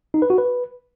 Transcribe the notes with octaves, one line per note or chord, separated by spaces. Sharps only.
D#4
B4
F#4
B4